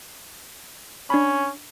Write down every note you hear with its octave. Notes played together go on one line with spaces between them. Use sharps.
C#4 D4 B5